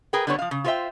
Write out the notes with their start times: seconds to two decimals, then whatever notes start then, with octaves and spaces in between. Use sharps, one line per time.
0.13 G#4 A#4 B4 G5
0.27 D3 G3 B3 D4 F#4 C#5
0.39 F3 F5
0.51 C#3
0.64 F4 F#4 C5 C#5 E5 G5